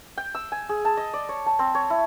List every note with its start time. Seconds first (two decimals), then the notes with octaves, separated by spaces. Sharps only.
0.17 G5
0.35 E6
0.52 G#5
0.69 G#4
0.85 A5
0.97 D#5
1.13 D5
1.29 C#5
1.46 A5
1.59 C4
1.75 C#5
1.90 E4